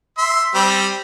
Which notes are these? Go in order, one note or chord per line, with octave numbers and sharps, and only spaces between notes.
E5 C6
G3 C4